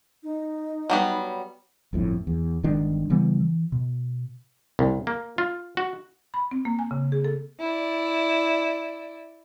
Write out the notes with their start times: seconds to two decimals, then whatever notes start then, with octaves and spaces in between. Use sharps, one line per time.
0.23 D#4
0.90 F#3 G3 B3
1.93 G1 F2 A2
2.27 E2
2.63 G1 D#3 G#3 D4
3.10 C#3 E3 G3 B3
3.40 E3
3.72 B2
4.79 C2
5.07 A#3
5.38 F4
5.77 F#4
6.34 B5
6.51 C4
6.65 A#3
6.79 G#5
6.91 C#3
7.12 G#4
7.24 A4
7.61 E4 D5